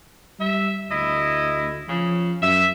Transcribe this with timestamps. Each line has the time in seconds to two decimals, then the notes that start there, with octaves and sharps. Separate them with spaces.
0.40 G3 E5
0.91 D2 E4 D#5
1.89 C#3 F3
2.42 F#2 E5